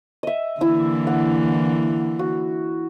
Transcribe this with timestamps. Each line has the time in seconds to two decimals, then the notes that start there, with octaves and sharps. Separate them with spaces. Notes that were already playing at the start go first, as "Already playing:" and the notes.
0.23 D#5 E5
0.61 D3 E3 A#3 E4 E6
1.07 F#5
2.19 F#4